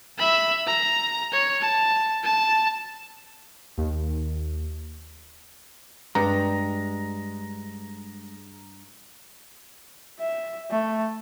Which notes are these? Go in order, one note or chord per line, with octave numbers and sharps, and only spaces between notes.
E5 B5
A#5
C#5
A5
A5
D#2
G2 G#3 A#5
E5
A3